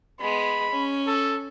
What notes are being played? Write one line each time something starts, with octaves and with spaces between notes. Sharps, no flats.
G#3 B3 B5
C#4
A4